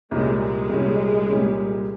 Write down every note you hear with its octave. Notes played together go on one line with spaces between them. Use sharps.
C2 A#2 G3 G#3 C#4
G#3
C2 A#2 G3 C#4
C2 A#2 G3 C#4